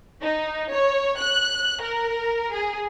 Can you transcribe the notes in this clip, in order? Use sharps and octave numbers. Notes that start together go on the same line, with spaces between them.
D#4
C#5
F#6
A#4
G#4